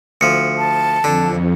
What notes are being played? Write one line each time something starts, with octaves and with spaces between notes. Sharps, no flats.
D2 F3 C#7
A5
F2 D3